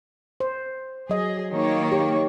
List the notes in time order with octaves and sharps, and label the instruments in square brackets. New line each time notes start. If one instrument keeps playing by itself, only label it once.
[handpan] C5
[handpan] F#3 D#5 [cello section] G#4
[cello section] D#3 A#3 C#5
[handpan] G4